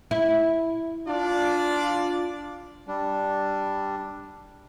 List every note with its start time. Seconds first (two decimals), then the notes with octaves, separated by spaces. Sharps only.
0.11 E4
1.07 D4 F4 D5
2.88 G3 D4